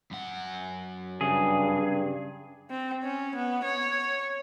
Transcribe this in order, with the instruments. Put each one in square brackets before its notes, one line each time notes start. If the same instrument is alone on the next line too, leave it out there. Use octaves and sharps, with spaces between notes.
[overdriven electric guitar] F#2 F#5
[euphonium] G2 [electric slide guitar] C#3 [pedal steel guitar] G#4
[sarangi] C4
C#4
B3
C#5